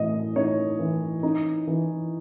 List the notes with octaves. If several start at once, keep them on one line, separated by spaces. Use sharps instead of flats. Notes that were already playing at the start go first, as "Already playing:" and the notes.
Already playing: A2 E3 D#5
D#4 C#5
E3
D#4
E3